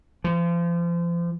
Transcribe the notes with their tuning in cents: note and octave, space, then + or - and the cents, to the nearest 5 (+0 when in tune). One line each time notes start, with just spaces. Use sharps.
F3 -35